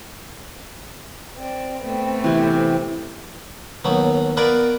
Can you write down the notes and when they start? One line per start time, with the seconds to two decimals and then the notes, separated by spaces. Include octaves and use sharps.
1.38 C4 D5
1.84 A3 B3 C4
2.24 C3 E3
3.84 D#2 F#3 B3
4.37 B3 A#4 B4 D5 F5 G#5